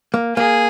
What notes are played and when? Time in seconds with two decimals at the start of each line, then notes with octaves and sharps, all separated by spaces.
0.14 A#3
0.37 A#3 G#4